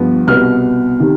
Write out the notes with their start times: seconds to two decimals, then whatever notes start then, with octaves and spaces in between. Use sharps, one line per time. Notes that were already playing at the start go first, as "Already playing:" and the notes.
Already playing: G1 G2 F3 B3
0.27 C2 B2 B3 F6
1.00 C3 D#3